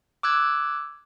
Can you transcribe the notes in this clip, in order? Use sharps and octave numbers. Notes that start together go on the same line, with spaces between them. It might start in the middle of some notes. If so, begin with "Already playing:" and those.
D6 E6 F#6 G#6